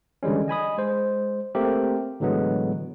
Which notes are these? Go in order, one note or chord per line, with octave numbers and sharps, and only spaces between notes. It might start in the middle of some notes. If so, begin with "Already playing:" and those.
D3 E3 G3 G#3 C#4
D#5 G#5 B5 D#6
G#3 C5
A3 A#3 C4 G4 A#4
A2 D3 E3 F#3 G#3 B3